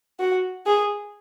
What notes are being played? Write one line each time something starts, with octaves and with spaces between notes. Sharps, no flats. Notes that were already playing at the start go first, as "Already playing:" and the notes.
F#4
G#4